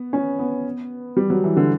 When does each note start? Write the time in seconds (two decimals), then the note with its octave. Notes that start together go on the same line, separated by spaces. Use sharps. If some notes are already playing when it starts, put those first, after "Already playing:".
Already playing: B3
0.13 C#4
0.39 B3
1.17 G3
1.30 F#3
1.44 E3
1.57 D3